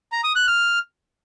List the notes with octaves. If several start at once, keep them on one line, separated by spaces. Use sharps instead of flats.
A#5
D#6
F#6
F6